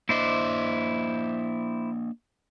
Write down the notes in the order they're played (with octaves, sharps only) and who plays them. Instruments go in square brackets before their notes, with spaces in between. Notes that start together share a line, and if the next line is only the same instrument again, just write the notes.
[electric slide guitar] A#3 D4 D#5 [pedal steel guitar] E4 C5 D5